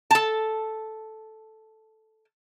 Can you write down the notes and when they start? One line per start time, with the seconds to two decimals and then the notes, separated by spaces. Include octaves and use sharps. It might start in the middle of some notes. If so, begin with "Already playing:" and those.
0.11 A4 A5